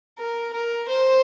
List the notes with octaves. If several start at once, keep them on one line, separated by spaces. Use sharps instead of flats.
A#4
A#4
C5